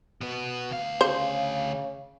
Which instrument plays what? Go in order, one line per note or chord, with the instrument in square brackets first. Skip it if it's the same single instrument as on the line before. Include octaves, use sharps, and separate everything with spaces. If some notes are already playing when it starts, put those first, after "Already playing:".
[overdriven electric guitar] B2 B3
D2 F5
[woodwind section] C#3 [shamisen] C5